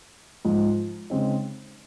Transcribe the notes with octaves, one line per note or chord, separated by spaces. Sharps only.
G#2 F3 G#3
C#3 G#3 C4 D#4